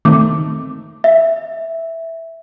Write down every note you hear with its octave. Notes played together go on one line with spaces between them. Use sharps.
D#3 A3 C4 D6
E5